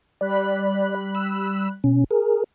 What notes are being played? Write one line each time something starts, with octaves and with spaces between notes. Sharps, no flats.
G3 D5 B5 F#6
E6
B2 C#4
G#4 A#4